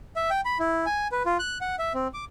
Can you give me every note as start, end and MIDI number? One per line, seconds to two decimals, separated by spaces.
0.16 0.30 76
0.30 0.41 79
0.45 0.58 83
0.59 0.86 64
0.86 1.08 80
1.12 1.23 71
1.26 1.37 65
1.39 1.58 90
1.61 1.76 78
1.79 1.93 76
1.94 2.08 60
2.14 2.25 86